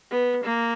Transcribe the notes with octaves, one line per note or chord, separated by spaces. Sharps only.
B3
A#3